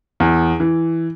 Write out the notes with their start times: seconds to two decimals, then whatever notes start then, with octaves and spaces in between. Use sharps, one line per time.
0.20 E2
0.60 E3